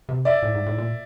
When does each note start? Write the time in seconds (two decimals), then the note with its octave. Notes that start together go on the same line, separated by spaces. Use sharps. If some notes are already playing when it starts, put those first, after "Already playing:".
0.09 C3
0.25 D5 E5
0.42 A2
0.54 G#2
0.66 A2
0.78 A#2